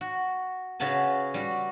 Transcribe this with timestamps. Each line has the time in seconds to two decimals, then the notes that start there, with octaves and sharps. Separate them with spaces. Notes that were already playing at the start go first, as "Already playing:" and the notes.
0.01 F#4
0.80 C#3 F#4 G#4 B4 A5
1.34 G3 F#4